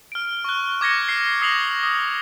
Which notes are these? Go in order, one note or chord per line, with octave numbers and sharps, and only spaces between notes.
F6 D7
C#6 F#6
D6 G#6 A#6 C#7
F6 C7 C#7
D#6 A#6 C7 F7 F#7
D#6